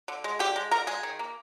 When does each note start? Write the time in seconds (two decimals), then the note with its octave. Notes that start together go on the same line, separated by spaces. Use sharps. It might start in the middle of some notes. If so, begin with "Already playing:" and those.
0.08 D3
0.24 G#3
0.39 D3 G4
0.56 G#3
0.71 D3 A#4
0.87 G#3 G#4
1.03 D#3
1.19 A#3